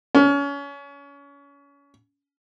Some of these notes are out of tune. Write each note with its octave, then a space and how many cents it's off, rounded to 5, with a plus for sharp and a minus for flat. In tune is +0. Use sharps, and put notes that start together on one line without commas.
C#4 +30